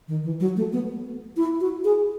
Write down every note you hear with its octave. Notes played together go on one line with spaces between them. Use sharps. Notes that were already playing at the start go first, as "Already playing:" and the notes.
D#3
E3
F#3
A3
B3
E4
F#4
G#4